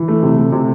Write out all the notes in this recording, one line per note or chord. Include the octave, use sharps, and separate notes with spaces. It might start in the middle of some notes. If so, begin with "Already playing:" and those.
Already playing: E3
A3
C3
A3
C3